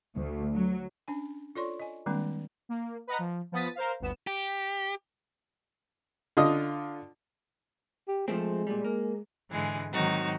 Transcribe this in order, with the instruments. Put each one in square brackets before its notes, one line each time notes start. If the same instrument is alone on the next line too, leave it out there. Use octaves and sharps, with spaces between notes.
[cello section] D2
F#3
[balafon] C#4 D4 G#5
F4 A4 C#5 D5 C6 C#6
D#5 G#5
D#3 G3 G#3 A#3 C4 D4
[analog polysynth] A#3
B4 D#5 F#5 A#5
F3
F3 B3 D#6 A6 B6
A#4 C5 F5
G1 D2 B3 E7
[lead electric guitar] G4
[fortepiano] D3 F4 D#5 D#6
[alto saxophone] G4
[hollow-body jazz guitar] F3 A3 C4 [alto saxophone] G#3
[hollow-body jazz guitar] A#2 G3
A#3
[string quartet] G#2 D3 E3 G#3 G#4
G#2 D#3 F#3 C4 D#4 F#4